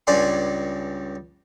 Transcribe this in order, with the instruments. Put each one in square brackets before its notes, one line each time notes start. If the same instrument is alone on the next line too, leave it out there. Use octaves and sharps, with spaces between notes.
[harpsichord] C#2 G2 D5 G#5 C6